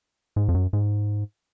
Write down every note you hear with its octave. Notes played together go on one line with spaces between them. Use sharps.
G#2
F2
F#2
G#2